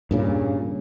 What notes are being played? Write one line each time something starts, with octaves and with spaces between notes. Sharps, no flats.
G2 A#2 C#3